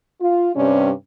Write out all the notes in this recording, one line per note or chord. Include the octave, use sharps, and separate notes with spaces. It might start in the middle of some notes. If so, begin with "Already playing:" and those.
F4
G2 C3 G3 C#4